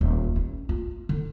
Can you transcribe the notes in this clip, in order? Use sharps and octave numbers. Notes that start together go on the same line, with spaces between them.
D#1
C#4
F4
D3